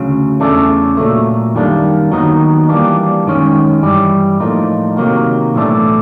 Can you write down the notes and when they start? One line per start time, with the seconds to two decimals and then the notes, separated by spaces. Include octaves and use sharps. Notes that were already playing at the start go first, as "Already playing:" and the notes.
Already playing: D2 C#3 F#3
0.40 E2 C#3 E3 A3 D4
0.97 A#2 F#3 A3
1.55 F#2 D#3 G3 A#3 D4
2.12 D#2 D#3 F#3 B3 D#4
2.69 E3 G3 A#3 D4
3.26 F#2 D#3 G#3 C#4
3.83 G2 E3 G3
4.40 A2 F3 A#3 D#4
4.97 C3 D#3 F#3 A#3
5.55 B1 A2 E3 A3 D4